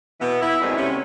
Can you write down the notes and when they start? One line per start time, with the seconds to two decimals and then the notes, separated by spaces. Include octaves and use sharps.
0.21 B2 E3 B3
0.41 E4
0.62 F#2 D#3 G3 G#3 B3 C4
0.77 C3 A3 C#4